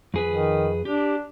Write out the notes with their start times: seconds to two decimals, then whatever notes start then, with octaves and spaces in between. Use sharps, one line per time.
0.14 F2 G#4 B4
0.30 D#3
0.85 D4 G4